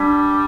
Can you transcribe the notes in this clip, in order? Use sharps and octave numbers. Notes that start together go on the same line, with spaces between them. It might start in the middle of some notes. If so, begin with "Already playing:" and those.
Already playing: G3 D4